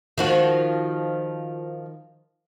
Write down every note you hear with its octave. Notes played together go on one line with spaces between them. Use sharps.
D#3 F3 F#4